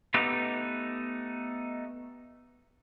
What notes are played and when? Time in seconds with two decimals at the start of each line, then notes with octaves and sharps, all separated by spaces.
0.14 A3 B3 D#4 G4 B4